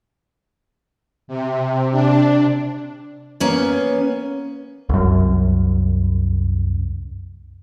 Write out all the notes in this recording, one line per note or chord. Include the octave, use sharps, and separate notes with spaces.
C3
D4
A#3 B3 C#4
C2 F#2